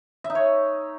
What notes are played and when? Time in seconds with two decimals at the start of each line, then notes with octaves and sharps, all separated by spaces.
0.24 E5
0.30 D#4
0.35 C#5